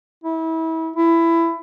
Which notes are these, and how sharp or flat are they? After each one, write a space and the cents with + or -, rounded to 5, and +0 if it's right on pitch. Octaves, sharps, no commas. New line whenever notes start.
E4 -30
E4 +15